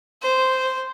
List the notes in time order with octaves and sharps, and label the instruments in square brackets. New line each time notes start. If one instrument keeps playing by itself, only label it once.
[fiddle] C5